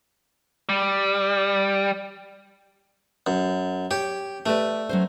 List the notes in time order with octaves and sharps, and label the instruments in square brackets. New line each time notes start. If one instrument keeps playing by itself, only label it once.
[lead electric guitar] G3
[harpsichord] F#2
[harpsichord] G4 [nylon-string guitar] C#5
[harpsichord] A3 [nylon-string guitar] G4 B4 D5
[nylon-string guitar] F#3 C#4 C5